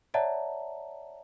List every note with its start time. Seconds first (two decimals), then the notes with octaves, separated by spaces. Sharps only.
0.14 C#5 D5 E5 F#5 A5 A#5